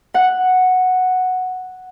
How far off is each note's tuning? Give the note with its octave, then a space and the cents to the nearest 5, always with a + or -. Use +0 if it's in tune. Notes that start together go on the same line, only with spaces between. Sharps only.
F#5 -5